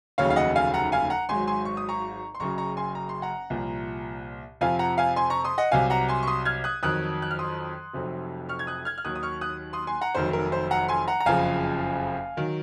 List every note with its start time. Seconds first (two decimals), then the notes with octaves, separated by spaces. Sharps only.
0.18 F1 D#2 C#3 F#3 C#5 F5
0.30 F5
0.36 D#5 F#5
0.56 F5 G#5
0.74 F#5 A#5
0.92 F5 G#5
1.10 F#5 A#5
1.29 G#1 G#2 F#3 G#5 C6
1.47 G#5 C6
1.65 C#6
1.77 D#6
1.89 A#5 C#6
2.35 C6
2.40 F#1 F#2 C#3 F#3 A#5 C#6
2.58 A#5 C#6
2.77 G#5 C6
2.95 A#5
3.09 C6
3.22 F#5 A#5
3.50 C2 A#2 F3
4.61 F2 C3 F3 F5 G#5
4.79 F#5 A#5
4.98 F5 G#5
5.16 G#5 C6
5.30 A#5 C#6
5.44 C6 D#6
5.58 D#5 F#5
5.71 C2 C3 F#3 F5 G#5
5.90 F#5 A#5
6.08 G#5 C6
6.23 C#6
6.27 C6 D#6
6.45 F6 G#6
6.64 D#6 F#6
6.83 F2 D#3 F#3 D#6 F#6
7.22 F#6
7.31 F6
7.39 C6 D#6
7.93 F1 F2 C3 F#3
8.49 C#6 F6
8.59 G#6
8.67 D#6 F#6
8.85 F6 G#6
8.98 F6
9.05 D#2 D#3 F#3 D#6 F#6
9.15 D#6
9.23 C#6 F6
9.41 D#6 F#6
9.73 C6 D#6
9.87 G#5 C6
10.01 F#5 A#5
10.15 F1 F2 D#3 F#3 C5
10.33 A#4
10.52 C5
10.71 F#5 A#5
10.88 G#5 C6
11.08 F#5 A#5
11.20 A#5
11.26 F#1 F2 C#3 F3 F5 G#5
12.37 D#3 F#3